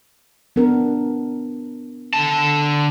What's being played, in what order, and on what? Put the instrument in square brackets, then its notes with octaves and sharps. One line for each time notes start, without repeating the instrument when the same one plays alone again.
[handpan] B3 D4 A#4
[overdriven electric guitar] D3 A5